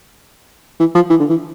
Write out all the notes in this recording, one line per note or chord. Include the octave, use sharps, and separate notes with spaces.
E3
F3
E3
D3
E3